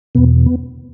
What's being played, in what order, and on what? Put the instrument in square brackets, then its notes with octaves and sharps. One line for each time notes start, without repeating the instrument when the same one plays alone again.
[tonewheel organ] E2 B2 B3
B3